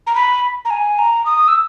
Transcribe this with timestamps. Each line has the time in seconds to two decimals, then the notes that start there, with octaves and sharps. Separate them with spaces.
0.07 A#5
0.15 B5
0.65 A#5
0.70 G#5
0.99 A#5
1.26 D#6
1.48 E6